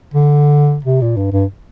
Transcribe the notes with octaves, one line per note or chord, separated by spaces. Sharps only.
D3
C3
A#2
G2
G2